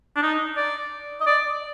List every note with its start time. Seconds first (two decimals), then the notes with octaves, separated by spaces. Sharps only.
0.16 D4
0.23 D#4
0.57 D5
1.21 D#5
1.26 D5